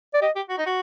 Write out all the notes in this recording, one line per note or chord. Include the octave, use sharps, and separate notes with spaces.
D5
G4 D#5
G4
F#4
D#4
F#4